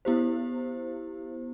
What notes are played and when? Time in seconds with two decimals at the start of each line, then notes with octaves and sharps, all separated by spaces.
0.05 B3 E4 G4 C5